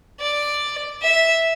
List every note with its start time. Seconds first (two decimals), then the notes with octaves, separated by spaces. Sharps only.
0.20 D5
1.02 E5